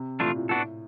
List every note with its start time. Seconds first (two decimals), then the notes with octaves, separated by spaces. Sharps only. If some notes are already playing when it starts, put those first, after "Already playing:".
Already playing: C3
0.20 A#2 E3 A3 D4 F4
0.35 A2
0.49 A2 B3 D4 F#4 A4